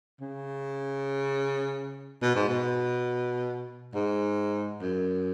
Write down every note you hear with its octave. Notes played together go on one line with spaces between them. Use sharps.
C#3
B2
G#2
B2
G#2
F#2